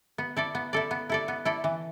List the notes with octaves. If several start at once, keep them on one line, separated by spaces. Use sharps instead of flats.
B3
E4 A4 D5
B3
E4 A4 D5
B3
E4 A4 D5
B3
E4 A4 D5
E3